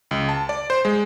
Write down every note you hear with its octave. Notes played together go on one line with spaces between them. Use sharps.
C#2
A5
D5
C5
G#3